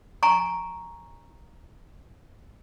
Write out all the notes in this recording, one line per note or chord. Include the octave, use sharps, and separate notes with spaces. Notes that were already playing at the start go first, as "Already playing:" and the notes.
G#5 A#5 C#6